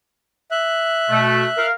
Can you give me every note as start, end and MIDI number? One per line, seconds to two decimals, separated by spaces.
0.51 1.66 76
0.51 1.66 90
1.10 1.45 47
1.10 1.45 57
1.58 1.72 70
1.58 1.72 77